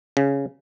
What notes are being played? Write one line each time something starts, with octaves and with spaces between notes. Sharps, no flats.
C#3